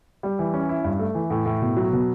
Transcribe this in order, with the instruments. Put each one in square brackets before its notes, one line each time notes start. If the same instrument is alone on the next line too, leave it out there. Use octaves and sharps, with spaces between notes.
[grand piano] G3
E3
C#4
E4
G2
A3
E3
A2
A2
B2
F#3
B2